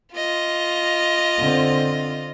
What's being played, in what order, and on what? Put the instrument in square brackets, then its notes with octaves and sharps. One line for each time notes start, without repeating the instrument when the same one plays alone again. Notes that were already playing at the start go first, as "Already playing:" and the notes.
[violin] F4 D#5
[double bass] D3 C4